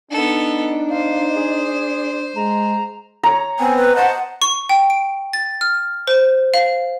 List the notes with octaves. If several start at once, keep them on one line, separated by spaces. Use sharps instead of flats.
B3 D4 D#4 A4
C5 F5
G#4
G#3 A#5
C#5 A#5
B3 C4 G#5
B4
C5 D#5 F#5 A5
C#6
G5
D7
A6
F6
C5
F5